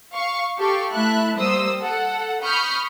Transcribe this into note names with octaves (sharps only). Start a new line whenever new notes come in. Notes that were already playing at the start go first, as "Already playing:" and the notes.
F5 C#6
G4 A4 F5 C#6
A3 E4 E5 A5 B5 F#6
G3 A#3 C5 D#6 E6
A4 F#5
B5 C#6 D#6 F6 G6